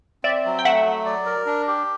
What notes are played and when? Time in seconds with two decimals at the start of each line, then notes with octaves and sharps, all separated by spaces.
0.24 C4 D5 E5
0.45 F#3
0.59 G5
0.65 A3 E5 F#5
0.86 F#3
1.05 D5
1.26 A#4
1.46 D4
1.68 G4